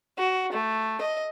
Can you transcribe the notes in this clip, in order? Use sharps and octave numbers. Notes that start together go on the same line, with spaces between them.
F#4
A3
D#5